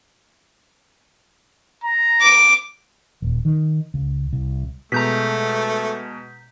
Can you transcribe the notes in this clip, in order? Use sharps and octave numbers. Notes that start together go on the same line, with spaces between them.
A#5
D6
D#1
D#3
C#2
C2
B2 G#3 A3 A#5 G6 B6